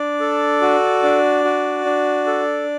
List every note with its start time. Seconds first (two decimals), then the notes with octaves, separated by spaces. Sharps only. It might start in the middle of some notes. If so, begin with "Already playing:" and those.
Already playing: D4 D5
0.20 A4
0.61 F#4
1.03 D4
1.44 F#4
1.85 D4
2.27 A4